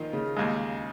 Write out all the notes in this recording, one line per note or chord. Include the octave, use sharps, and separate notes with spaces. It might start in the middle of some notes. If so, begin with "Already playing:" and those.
Already playing: A#2 D#3 F3 A#3 F4
C#3
D#2 C#3 G#3